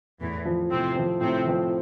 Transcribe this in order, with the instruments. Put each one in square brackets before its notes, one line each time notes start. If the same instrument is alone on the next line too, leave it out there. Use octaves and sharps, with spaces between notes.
[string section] E2 E3 [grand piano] A2
[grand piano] F3 C4
[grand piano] A2 [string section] C3 C4
[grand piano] F3 C4
[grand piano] A2 [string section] C3 C4
[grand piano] F3 C4